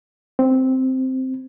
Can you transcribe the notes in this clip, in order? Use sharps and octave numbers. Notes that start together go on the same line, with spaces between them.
C4